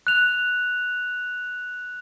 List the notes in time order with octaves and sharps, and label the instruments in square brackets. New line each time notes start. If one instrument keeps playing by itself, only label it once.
[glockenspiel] F#6 F7